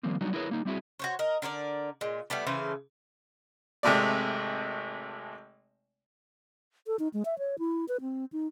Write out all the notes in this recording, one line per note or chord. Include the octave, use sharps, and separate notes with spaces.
D#3 F3 G3 A#3 C4
F#3 G3 B3 D4 D#4 F#4
E4 G#4 A#4 B4 C#5
G3 A#3 D#4
G3 C4 E4 F#4 G#4
F#4 C5 C#5
A#4 D#5
D3 A#4 C#5 D5
A#2 G#3
G3 A3 B3 D5
C#3 E3 A4 C5
G#1 C3 G#3 A3 D5
A4
D#4
G#3
E5
C#5
E4
B4
C4
D#4